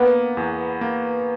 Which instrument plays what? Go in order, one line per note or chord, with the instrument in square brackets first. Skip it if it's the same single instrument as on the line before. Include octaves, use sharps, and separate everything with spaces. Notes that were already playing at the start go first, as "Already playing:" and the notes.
Already playing: [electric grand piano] A#3 [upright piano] B3
[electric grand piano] E2
A#3